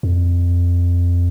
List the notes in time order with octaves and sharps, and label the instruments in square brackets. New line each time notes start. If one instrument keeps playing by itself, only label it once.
[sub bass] F2